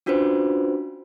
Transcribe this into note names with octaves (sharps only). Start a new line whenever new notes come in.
C#4 D4 F4 F#4 B4 C5